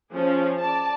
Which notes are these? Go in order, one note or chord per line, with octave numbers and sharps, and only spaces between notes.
F3 C#4 G#4
D5 A5